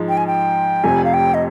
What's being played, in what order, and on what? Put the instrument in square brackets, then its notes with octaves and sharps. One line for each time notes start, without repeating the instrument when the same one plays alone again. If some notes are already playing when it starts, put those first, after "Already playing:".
Already playing: [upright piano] G#2 F3 G#3
[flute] G5
G#5
G5
[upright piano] F1 F2 C3 [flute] G#5
[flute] F5
G5
D#5